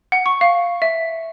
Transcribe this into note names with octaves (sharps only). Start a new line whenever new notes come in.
F#5
C#6
F5
E5